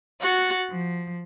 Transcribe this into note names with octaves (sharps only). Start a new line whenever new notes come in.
F#4 F#5 A6
F3